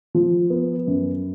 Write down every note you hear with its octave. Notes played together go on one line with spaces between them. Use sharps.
F3
B3
F#2